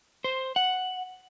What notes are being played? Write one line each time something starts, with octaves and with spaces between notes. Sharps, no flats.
C5
F#5